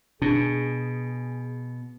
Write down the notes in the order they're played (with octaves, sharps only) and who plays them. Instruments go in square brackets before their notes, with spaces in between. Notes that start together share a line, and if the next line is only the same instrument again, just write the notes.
[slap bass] B2 [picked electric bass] D4 [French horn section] G#4